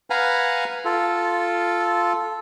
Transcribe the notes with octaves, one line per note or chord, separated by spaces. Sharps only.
B4 F5 F#5 G#5 A#5 B5
F4 A4